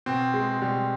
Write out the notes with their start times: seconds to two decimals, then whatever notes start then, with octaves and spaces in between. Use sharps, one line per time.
0.06 B2 C4
0.34 G#3
0.61 B2 G3